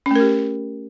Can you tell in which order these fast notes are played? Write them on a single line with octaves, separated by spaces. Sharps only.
C#4 A3 A#4 G4